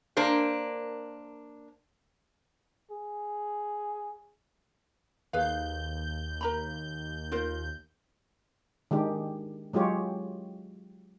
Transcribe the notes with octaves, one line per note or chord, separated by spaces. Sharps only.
A#3 D4 A#4 C5
G#4
D#2 G#4 B4 F5 G6
A#4 A#5 B5
F4 A#4 C5
D#3 G#3 D4 G4
F#3 G#3 F4 G4 C#5